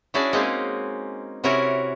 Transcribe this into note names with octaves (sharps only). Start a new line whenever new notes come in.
C#4 D4 E4 F#4 G#4 D5
G#3 A#3 C4 C#4 D#4
C3 C#4 E4 F#4 A#4 C#5